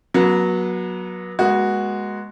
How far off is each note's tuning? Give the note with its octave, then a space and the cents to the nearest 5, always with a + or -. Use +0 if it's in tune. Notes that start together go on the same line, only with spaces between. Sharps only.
F#3 -10 B3 -40
G#3 +0 B3 -45 F#4 +0